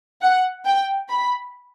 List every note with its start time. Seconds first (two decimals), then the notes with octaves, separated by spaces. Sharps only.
0.22 F#5
0.65 G5
1.09 B5